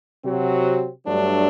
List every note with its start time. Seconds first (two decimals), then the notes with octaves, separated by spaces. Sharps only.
0.24 C3 F#3 C4 F#4
1.05 G2 F#3 A3 D4